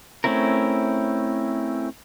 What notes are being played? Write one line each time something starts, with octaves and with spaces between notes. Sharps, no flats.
A3 C4 C#4 E4 A#4